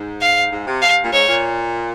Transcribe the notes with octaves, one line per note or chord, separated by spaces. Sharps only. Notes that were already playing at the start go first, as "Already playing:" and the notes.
Already playing: G#2
F5
G#2
C3
G2 F5
A#2
G#2 C#5
A#2